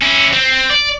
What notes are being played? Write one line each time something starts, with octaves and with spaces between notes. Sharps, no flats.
C#4 E4
C4
D5